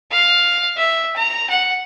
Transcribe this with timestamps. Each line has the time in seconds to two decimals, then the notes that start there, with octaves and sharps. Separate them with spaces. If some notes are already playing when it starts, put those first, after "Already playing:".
0.11 F5
0.77 E5
1.16 A#5
1.50 F#5